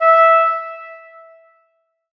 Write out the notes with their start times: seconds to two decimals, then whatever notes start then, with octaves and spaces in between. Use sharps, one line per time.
0.01 E5